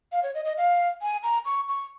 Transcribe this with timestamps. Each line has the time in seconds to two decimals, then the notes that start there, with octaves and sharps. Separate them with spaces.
0.12 F5
0.23 C#5
0.34 D#5
0.45 D#5
0.57 F5
1.02 G#5
1.23 A#5
1.46 C#6
1.68 C#6